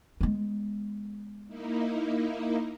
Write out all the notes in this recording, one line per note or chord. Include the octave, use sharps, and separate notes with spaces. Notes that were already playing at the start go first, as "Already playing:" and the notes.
G#3 B3
A#3 D#4 E4